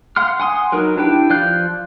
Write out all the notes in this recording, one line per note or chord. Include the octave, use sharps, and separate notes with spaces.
F5 F#5 C6 F6
F#5 G#5 C6 D#6
F#3 D#4 A#4 B4
D4 E4 G4 B4 G5
F3 D5 F5 F#6 G6